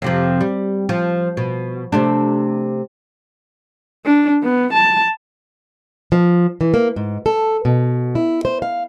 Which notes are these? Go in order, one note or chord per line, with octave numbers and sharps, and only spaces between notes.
F2 C3 F3
G3
F3
B2
C3 A3 D4
D4
B3
A5
F3
E3
A#3
G#2
A4
B2
E4
C5
F5